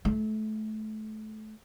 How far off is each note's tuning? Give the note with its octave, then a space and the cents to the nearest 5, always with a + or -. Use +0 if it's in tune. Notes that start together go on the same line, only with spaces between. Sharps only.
A3 -25 E4 +40